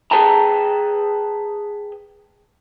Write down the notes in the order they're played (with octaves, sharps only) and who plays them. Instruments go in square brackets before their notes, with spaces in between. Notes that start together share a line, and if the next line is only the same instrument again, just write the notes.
[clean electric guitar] G#4 B4 G5 A5 A#5